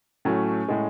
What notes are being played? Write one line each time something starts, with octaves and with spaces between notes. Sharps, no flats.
A2 F#3 A3 C#4
A2 G#3